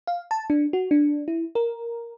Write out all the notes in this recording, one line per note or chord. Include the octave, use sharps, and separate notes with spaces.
F5
A5
D4
F#4
D4
E4
A#4